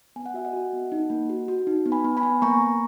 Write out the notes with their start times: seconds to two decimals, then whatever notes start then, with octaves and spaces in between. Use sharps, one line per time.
0.16 B3 G#5
0.26 F#5
0.34 F#4 E5
0.45 D#5 F#5
0.53 F#4
0.73 B3
0.92 D#4
1.10 A#3
1.30 F#4
1.48 F#4
1.67 D#4
1.86 B3
1.92 G#5 B5
2.04 B3
2.17 G#5 B5
2.23 B3
2.42 A#3 A#5 C#6
2.61 A#3